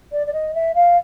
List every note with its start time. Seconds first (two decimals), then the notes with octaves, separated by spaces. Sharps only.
0.12 D5
0.27 D5
0.33 D#5
0.54 E5
0.75 F5